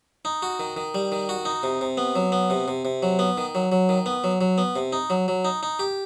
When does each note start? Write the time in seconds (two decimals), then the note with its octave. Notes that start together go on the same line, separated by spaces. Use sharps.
0.25 D#4
0.42 F#4
0.60 D#3
0.77 D#3
0.95 G3
1.12 D#3
1.29 F#4
1.45 D#4
1.63 C3
1.81 C3
1.97 B3
2.16 F#3
2.32 B3
2.50 C3
2.68 C3
2.85 C3
3.03 F#3
3.19 B3
3.38 D#3
3.55 F#3
3.72 F#3
3.89 D#3
4.06 B3
4.24 F#3
4.41 F#3
4.58 B3
4.76 C3
4.93 D#4
5.10 F#3
5.28 F#3
5.45 D#4
5.63 D#4
5.79 G4